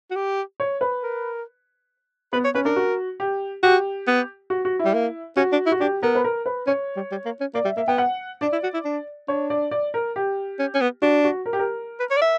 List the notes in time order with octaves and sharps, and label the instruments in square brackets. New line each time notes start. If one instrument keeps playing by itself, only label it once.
[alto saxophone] F#4
G4
[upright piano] C#5
B4
[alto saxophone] A#4
[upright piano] B3 [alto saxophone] B4
[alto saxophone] C#5
[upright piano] C#4 [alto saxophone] B4
[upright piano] D4 [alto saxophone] A#4
[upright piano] F#4
G4
[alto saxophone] F#4 [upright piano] G4
[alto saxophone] B3
[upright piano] F#4
F#4
E4
[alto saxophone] G3
A#3
[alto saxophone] C#4 [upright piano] F#4
[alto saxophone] D4
E4
[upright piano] F#4
[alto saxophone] D4 [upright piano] G4
[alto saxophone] B3 [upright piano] A#4
[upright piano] B4
A#4
B4
[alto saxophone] C#4 [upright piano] C#5
[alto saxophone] G3
G3
A#3
C#4
[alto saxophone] A#3 [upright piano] D5
[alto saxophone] G3 [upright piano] E5
[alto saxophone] A#3 [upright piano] E5
[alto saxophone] B3 [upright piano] G5
[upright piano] F#5
[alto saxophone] D4 [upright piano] D5
[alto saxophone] E4
F#4
E4
D4
[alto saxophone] D4 [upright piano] C#5
[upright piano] D5
D5
A#4
G4
[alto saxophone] C#4
C#4
B3
[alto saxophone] D4 [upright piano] F#4
[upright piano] F#4
A#4
G4
A#4
[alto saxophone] B4
C#5
D5
E5